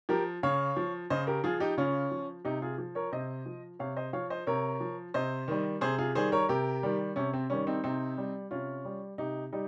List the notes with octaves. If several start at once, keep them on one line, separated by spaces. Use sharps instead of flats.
F3 G4 A#4
C#3 C#5 F5
F3
C#3 C5 D#5
G4 A#4
F3 F4 G#4
D#4 G4
C#3 C#4 F4
F3
C3 D#4 G4
F4 G#4
F3
A#4 C#5
C3 C5 D#5
F3
C3 C#5 F5
C5 D#5
F3 C#5 F5
C5 D#5
C3 A#4 C#5
F3
C3 C5 D#5
D#3 G3
C3 G#4 C5
F4 G#4
D#3 G3 G#4 C5
A#4 C#5
C3 G4 A#4
D#3 G3
C3 C#4
C4
D#3 G3 C#4
C4 D#4
C3 C4 D#4
G3
C3 C#4 F4
G3
C3 D#4 G4
G3 D#4 G4